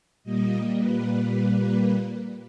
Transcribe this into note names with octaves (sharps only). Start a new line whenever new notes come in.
A#2 G3 A#3 D#5
B4